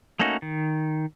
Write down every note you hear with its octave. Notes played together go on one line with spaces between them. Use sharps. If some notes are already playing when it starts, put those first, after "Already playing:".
A3 A#3 C#4 D#4 F#4
D#3